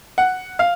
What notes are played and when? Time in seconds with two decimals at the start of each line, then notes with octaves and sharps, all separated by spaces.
0.18 F#5
0.59 F5